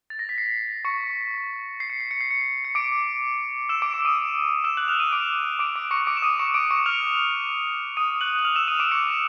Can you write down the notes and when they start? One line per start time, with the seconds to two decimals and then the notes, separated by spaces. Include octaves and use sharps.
0.10 A6
0.19 A#6
0.29 B6
0.38 C7
0.85 C#6 C#7
1.80 C7
1.90 C#7
2.01 C7
2.11 C#7
2.21 C7
2.31 C#7
2.41 C7
2.65 C#7
2.75 D6 D7
3.69 E6 E7
3.82 D6 D7
3.93 D6 D7
4.05 D#6 D#7
4.64 E6 E7
4.77 F#6 F#7
4.88 F6 F7
5.00 D#6 D#7
5.12 D6 D7
5.59 D6 D7
5.76 D6 D7
5.91 C#6 C#7
6.07 D6 D7
6.17 E7
6.22 D#6 D#7
6.39 C#6 C#7
6.54 D6 D7
6.70 C#6 C#7
6.86 F6 F7
7.97 D#6 D#7
8.21 F#6 F#7
8.39 F#7
8.45 F6 F7
8.56 E6 E7
8.68 D#6 D#7
8.79 D6 D7
8.91 C#6 C#7